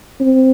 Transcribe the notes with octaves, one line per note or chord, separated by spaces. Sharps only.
C4